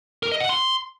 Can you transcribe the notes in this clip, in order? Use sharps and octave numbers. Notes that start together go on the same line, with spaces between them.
A#4
D#5
F#5
C6